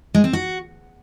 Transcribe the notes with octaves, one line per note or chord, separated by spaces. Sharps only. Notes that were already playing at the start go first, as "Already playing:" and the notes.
G#3
C4
F#4